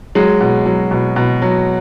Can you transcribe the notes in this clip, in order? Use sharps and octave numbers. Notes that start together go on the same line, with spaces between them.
F#3 G#3
B2
F#3
B2
B2
F#3